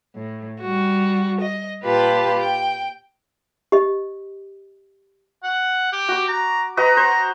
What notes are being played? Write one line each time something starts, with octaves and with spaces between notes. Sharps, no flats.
A2
G3 F#4
D#5
A#2 F4 G4 B4 A5 B5
G5
G4 D#5
F#5
G4
F#4 D6
A#5
F#4 B4 D#5 A#5
C5